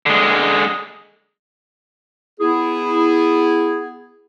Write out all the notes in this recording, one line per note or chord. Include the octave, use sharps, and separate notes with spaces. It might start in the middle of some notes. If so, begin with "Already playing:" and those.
D3 G#3
B3 E4 G#4